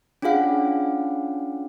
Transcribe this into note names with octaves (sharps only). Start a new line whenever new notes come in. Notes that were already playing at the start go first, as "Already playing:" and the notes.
C#4 D4 F4 G#4 F5 F#5